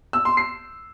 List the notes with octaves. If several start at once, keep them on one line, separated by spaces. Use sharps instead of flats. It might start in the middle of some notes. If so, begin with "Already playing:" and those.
E6
C6
C7